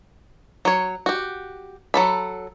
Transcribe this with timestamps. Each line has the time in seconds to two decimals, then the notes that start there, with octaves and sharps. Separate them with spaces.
0.65 F#3 C#5
1.06 F#4 G4
1.94 F#3 A4 B5